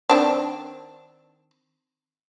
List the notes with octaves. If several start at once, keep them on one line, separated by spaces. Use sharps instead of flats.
D#3 C4 D4